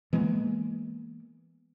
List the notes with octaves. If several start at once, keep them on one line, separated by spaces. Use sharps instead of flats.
E3 G#3 A#3 B3